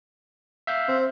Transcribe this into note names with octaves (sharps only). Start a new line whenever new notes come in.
E5 F5 G6
C4